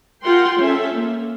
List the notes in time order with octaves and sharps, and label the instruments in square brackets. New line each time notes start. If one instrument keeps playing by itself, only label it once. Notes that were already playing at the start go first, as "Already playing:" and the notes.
[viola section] F4 A#4 F#5 G5 C6
C#4 A4 E5
A#3